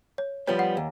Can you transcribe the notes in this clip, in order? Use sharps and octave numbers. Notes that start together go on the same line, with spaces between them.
C#5
F3 G3 B3 C#5
F#5
D#2